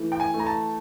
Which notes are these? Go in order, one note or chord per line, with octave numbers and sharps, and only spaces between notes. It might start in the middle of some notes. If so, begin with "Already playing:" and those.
Already playing: E3 A3
G5
G#5
A3
A#5
A5